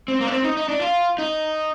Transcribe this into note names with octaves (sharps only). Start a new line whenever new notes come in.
C4
A#3
D4
C4
D#4
D#4
D4
F4
D#4